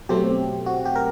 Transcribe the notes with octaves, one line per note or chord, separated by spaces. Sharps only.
B2 F#3 A3 C4 G4
F#4
G4
A#4